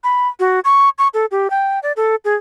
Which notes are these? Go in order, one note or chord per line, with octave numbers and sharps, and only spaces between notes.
B5
F#4
C#6
C#6
A4
G4
G5
D5
A4
G#4